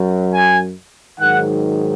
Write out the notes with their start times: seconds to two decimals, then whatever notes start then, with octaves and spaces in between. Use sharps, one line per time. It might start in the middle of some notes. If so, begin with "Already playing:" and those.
Already playing: F#2 F#3
0.32 G#5
1.19 G#2 D#3 F#3 F#5